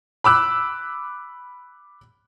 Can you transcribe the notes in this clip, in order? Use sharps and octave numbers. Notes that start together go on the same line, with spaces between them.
B5 D6 E6 F#6